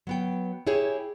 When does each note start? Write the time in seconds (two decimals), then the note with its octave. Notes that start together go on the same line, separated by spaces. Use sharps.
0.07 F#3 B3 G5
0.67 E4 G4 G#4 C#5